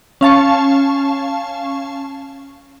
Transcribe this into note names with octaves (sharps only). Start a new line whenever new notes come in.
C#4 F5 A5 C#6